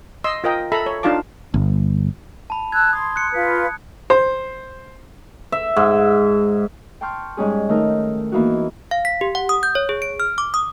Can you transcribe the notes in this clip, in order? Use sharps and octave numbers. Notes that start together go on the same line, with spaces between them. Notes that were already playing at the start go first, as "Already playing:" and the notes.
D#5 C6 E6
F4 A#4 D#5 G5
A4 E5 A#5 B5
C#5
D4 D#4 F4 F5 A5 D6
G1
A5 B5
A5 E6 F#6 G#6
C6 D#6
F#6 C#7
F4 B4
C5
E5
G#2
G5 A5 C6 C#6 F6 G6
G#2 G3 C#4 G#4
D#3 A3 D#4 A#4
E3 A#3 B3 D#4 E4 F#4
F5
B6
G4
F#5
D#6
G6
C#5
G#4
D7
F6
D6
D#6